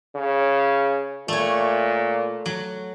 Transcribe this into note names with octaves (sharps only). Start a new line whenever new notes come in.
C#3
A#2 A3 C#5
F#3